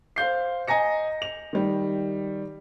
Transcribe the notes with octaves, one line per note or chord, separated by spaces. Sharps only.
C5 F5 G6 C7
D#5 G#5 A#5 A#6 C#7
F7
D#3 G3